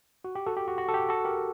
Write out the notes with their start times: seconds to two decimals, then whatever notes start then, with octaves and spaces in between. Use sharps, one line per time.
0.24 F#4
0.35 G4
0.46 F#4 A4
0.57 G4
0.68 F#4
0.78 F#4
0.88 A4
0.94 G4
1.09 F#4 A4
1.25 G4 A#4